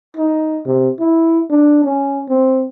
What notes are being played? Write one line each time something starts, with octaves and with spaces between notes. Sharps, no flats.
D#4
C3
E4
D4
C#4
C4